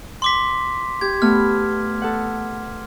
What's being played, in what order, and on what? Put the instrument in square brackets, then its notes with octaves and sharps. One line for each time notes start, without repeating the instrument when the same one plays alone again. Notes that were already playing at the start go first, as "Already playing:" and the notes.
[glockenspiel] C6 D6 B6
[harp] G4 [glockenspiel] G#6
[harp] A3 B3 [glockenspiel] F6
[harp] A4 F#5